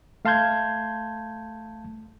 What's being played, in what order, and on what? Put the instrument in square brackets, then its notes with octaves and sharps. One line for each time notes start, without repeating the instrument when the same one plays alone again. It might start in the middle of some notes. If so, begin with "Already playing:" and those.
[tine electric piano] A3 F5 A5 C6 G6 G#6